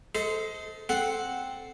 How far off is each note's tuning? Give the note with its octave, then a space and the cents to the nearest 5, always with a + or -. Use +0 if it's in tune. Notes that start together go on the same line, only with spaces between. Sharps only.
A4 +0 C5 -15 D#5 +30
C4 +0 A4 +0 F#5 +0